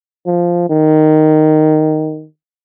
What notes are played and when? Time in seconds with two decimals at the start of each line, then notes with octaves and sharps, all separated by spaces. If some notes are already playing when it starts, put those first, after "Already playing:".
0.26 F3
0.69 D#3